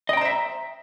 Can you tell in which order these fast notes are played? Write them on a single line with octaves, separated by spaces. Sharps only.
D#5 G5 A#5 C5 E5